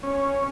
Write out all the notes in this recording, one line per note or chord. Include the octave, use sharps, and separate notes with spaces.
C#4